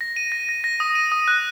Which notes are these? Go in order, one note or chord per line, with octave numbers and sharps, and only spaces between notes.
A#6
D#7
A#6
A#6
A#6
D#6
D#7
D#6
F#6